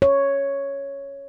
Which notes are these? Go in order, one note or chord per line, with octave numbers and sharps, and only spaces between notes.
C#5